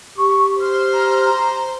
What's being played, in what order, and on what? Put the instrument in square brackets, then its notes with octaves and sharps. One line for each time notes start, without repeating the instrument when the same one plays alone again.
[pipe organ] G4 [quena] C#6
[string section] C5 [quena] F6
[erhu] A#5